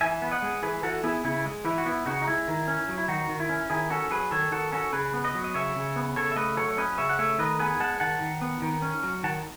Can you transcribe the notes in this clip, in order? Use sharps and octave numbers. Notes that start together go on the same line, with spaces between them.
E3 E5 G#5
B3
D#5 F#5
G#3
E3 G#4 B4
E3 F#4 A4
B3 E4 G#4
C#3 E4
G#3
E3 E4
F#4
B3 E4
C#3 D#4 F#4
D#4
G#3 E4
D#3
C#4
F#3
E4
D#3 D#4 F#4
D#3
E4
C#4
D#3 E4 G#4
C#4 F#4 A4
F#3 G#4 B4
D#3 A4 C#5
D#3 F#4 A4
C#4 F#4 A4
C#3 G#4 B4
B3
B4 D#5
F#3
D#5
C#3 C#5 E5
C#3
B3
C#3 A4 C#5
E5
A3 B4 D#5
F#3 A4 C#5
C#5
C#4 B4 D#5
C#3 C#5 E5
F#5
A3 C#5 E5
D#3 B4 D#5
B3 G#4 B4
G#3 F#5 A5
D#3 F#5 A5
D#3
B3
D#3
C#4
F#3
D#3 F#5 A5